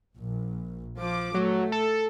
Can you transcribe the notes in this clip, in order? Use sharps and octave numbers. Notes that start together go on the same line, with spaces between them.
A#1
F3 D6
F#3 A3
A4